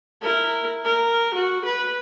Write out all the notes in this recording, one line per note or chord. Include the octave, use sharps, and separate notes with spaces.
E4 A#4
A#4
F#4
B4